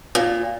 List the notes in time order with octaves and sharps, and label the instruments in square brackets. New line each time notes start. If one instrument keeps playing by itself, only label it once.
[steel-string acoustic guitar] A#2